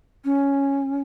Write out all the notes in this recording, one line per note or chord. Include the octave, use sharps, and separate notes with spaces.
C#4